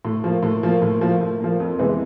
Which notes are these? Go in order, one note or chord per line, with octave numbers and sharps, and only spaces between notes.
A2
F3 A#3
A2
F3 A#3
A2
F3 A#3
A2
F3 A#3
F2
C3 E3 G#3 B3